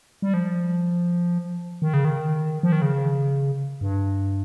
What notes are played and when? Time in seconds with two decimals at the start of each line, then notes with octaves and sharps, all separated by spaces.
0.22 G3
0.34 F3
1.82 D#3
1.94 C#3
2.05 D#3
2.63 F3
2.72 D#3
2.82 C#3
3.81 G2